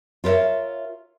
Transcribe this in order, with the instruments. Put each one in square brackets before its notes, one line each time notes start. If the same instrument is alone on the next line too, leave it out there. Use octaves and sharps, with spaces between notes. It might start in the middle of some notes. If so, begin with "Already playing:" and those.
[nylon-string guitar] F4 A#4 B4 C#5 E5